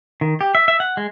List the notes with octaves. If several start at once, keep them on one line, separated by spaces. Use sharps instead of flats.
D#3
G4
E5
E5
F#5
G#3